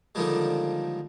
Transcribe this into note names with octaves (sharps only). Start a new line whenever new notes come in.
A#2 D3 D#3 F3 G3 G#3